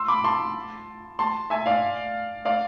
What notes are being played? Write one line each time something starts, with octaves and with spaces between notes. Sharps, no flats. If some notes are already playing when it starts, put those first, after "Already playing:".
Already playing: C6 E6
B5 D6
A5 C6
A5 C6
E5 G#5
D5 F5
D5 F5